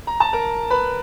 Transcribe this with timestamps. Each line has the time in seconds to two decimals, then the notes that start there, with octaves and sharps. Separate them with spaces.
0.07 A#5
0.20 A5
0.33 A#4 A#5
0.70 B4 B5